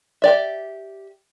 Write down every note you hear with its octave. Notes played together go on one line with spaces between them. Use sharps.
G4 D5 E5